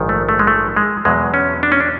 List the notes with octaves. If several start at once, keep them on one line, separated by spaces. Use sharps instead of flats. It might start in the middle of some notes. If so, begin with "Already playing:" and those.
Already playing: A#1 G#2 D#3
A3
A3
G#3
A3
G#3
E2 B2 F#3 G#3
C#4
D4
C#4
D4